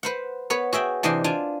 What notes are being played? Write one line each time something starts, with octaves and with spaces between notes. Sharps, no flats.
B4 C5 F#5
B3 B4 C#5
F#4 G#4 E5 G5
C3 E3 D4 D#5 G5 C6
D4 F4 G#5